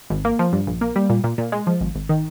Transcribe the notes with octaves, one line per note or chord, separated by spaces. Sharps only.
G#1
A#3
F3
G2
A#1
A#3
G3
A#2
A#2
A#2
G#3
F3
G#1
G#1
D#3